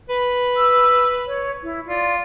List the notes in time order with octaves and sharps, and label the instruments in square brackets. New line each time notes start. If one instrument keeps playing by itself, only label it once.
[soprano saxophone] B4
[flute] E6
C#5
E4
[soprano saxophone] F4 [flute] D5